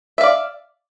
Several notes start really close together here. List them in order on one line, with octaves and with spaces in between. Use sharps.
E5 F5 D5